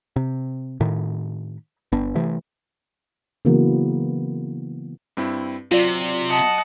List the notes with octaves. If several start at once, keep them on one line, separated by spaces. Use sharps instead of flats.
C3
A2 D#3
G1 B3 D4
C3 E3 A3
C#3 E3 F#3 A#3 B3
G2 C4 E4
C3 F#3 F4 D5
D#5 F#5 A5